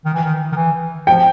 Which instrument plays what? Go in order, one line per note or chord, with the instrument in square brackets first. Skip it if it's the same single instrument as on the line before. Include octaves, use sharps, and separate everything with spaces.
[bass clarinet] D#3
E3
D#3
D#3
E3
[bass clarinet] F3 [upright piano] G5